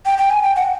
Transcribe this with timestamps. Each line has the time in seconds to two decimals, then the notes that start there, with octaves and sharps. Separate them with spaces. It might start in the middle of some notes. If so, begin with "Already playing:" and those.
0.06 G5
0.18 G5
0.30 G#5
0.43 G5
0.56 F#5